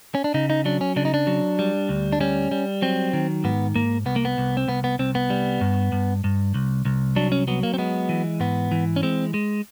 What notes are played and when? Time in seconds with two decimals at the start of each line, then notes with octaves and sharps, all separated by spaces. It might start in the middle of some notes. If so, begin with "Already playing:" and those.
0.15 C#4
0.24 D4
0.34 C#3 D#4
0.50 D#4
0.65 F#3 D4
0.81 C#4
0.96 C#3 D4
1.05 D#4
1.14 D4
1.27 F#3
1.59 G3
1.89 D2
2.13 D4
2.20 G3 C#4
2.51 G3
2.82 F#3 C4
3.13 D#3
3.44 G#2 B3
3.75 G#2 A#3
4.06 C2 B3
4.16 A#3
4.25 B3
4.38 C2
4.57 C4
4.68 C2 B3
4.84 B3
4.99 C2 C4
5.15 B3
5.30 G3
5.61 G2
5.92 G2
6.24 G2
6.54 C2
6.85 C2
7.16 F#3 D4
7.32 C#4
7.48 F#3 B3
7.63 A#3
7.74 C4
7.78 G#3 B3
8.09 E3
8.40 G#2 B3
8.71 E3
8.96 C#4
9.03 G#3 C4
9.34 G#3